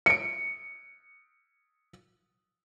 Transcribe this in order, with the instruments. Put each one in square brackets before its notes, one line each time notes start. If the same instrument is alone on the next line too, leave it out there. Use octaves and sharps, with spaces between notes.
[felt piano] C#7 D7